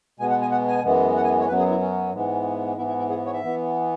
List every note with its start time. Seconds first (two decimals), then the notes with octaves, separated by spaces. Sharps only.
0.20 B2 G#3 B3 G#5
0.30 F#5
0.41 G#5
0.52 F#5
0.68 G#5
0.84 F#2 E3 G#3 B3
1.16 F#5
1.24 G#5
1.40 C#5
1.48 F#2 F#3 B3 B4
1.59 G#4
1.70 E4
1.81 C#4
2.13 G#2 E3 G#3 B3
2.77 G#2 E3 B3 E4
2.88 E4
2.99 E4
3.10 G#4
3.26 C#5
3.33 E5
3.43 E3 B3